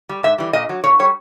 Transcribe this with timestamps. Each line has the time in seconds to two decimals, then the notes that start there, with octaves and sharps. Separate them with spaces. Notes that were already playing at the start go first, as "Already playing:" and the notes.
0.09 G3
0.23 G#2 E5
0.38 E3 G3
0.53 A#2 D#5
0.69 F#3
0.84 A#2 C#5
0.99 G3 C#5